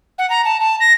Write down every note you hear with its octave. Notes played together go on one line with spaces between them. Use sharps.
F#5
A#5
A5
A5
A#6